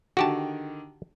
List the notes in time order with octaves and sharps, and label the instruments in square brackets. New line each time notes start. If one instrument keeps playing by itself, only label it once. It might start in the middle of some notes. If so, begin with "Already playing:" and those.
[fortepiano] D3 D#3 [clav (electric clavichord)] F#4 G4 A5